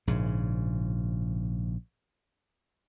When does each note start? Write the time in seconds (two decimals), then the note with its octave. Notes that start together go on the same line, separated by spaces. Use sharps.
0.07 A#1 G#2 C#3